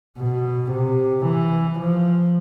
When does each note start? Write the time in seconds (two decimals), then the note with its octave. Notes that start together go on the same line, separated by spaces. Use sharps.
0.18 B2
0.71 C3
1.26 E3
1.80 F3